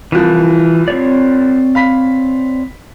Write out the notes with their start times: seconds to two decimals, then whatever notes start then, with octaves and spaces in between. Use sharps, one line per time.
0.12 C2 E3 F3 F#6
0.88 C4 C#5 D5
1.75 F5 B5 B6